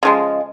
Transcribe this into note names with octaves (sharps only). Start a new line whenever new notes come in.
C#3 F3 G#3